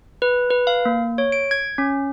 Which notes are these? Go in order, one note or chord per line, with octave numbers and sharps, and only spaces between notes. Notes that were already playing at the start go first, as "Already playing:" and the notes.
B4
B4
F5
A#3
C#5
D7
G#6
C#4